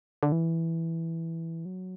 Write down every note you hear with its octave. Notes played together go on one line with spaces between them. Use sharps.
D3
E3
F#3